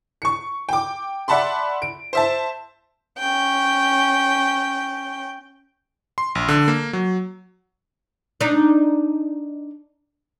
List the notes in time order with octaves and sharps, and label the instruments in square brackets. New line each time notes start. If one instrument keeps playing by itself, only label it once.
[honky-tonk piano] C#6 C#7
G5 D6
D5 E5 F#5 A5 B5 C6
D7
C5 E5 A5
[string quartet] C#4 G5
[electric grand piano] C6
A#1
D3
A#3
F#3
[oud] D4 D#4